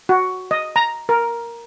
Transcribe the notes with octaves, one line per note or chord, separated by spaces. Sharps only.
F#4
D#5
A#5
A#4